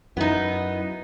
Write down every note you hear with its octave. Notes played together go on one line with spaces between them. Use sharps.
F#2 B3 D#4 E4